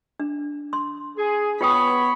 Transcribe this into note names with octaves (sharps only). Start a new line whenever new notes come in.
D4
C6
G#4
B3 F4 C#5 G5 B5 D#6